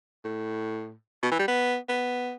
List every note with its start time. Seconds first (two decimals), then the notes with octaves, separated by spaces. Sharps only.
0.24 A2
1.23 B2
1.31 E3
1.39 G3
1.48 B3
1.89 B3